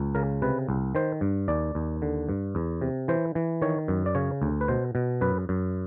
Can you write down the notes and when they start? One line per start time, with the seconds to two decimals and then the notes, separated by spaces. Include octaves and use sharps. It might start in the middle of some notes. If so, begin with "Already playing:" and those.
Already playing: C#2
0.15 C#3 A#4
0.42 C3 B4
0.69 C2
0.95 D#3 C5
1.21 G2
1.48 D#2 D5
1.75 D#2
2.02 D3
2.29 G2
2.55 E2
2.81 C3
3.08 E3 C5
3.35 E3
3.62 D#3 C#5
3.88 F#2
4.06 D5
4.15 C#3 C#5
4.42 D2
4.61 B4
4.68 B2 C5
4.95 B2
5.21 F#2 B4
5.49 F#2